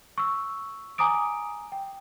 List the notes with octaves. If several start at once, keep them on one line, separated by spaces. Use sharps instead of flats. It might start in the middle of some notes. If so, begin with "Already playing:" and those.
C#6 E6
G#5 A#5 D6 D#6 D7
G5